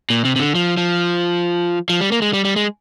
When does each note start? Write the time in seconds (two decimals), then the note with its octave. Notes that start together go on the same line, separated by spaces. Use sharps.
0.10 A#2
0.25 C3
0.36 C3
0.40 D3
0.55 F3
0.77 F3
1.90 F3
2.01 G3
2.12 A#3
2.22 G#3
2.33 G3
2.45 G3
2.56 G#3